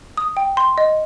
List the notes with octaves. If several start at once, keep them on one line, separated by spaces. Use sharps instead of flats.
D#6
G5
C6
D#5